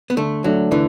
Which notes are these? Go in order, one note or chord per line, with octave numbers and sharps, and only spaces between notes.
B3
D3 A3
F#3 A3 D4 A4
D3 E3